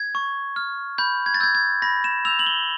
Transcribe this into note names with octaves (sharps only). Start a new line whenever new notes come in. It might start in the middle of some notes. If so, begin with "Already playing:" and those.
Already playing: G#6
C#6
F6
B5 G6
G#6
A6
E6 G6 G#6
G#6
B5 A#6
E7
E6 G6 F7
F#7
G7